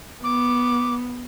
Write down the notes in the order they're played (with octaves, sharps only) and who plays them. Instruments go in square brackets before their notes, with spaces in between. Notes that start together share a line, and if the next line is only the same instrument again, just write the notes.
[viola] B3 [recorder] D6